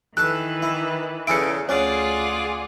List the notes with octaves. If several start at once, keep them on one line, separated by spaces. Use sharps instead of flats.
D#3 E3 A4 B4 A5 C#6 F#6
E4
E2 C#3 E4 G#4 A4 C#7 D7
D2 C#4 F4 G#4 C#5 D5 F#5